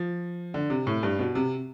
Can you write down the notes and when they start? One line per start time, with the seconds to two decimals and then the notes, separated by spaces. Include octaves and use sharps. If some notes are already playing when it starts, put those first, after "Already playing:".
Already playing: F3
0.54 D3
0.70 C3
0.87 A2
1.03 G2
1.19 B2
1.35 C3